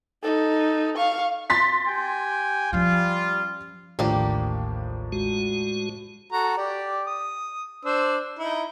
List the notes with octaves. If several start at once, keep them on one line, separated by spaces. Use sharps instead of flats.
D#4 A4
F5 C#6
C6 A6 B6
G4 G5 G#5
F3 G3 C#4 F4
A1 D#2 A2 F3 A#3 D4 G4
G#3 F#4
F#4 A4 A#5
G4 D5
D#6
D4 C5 E6
D#4 E4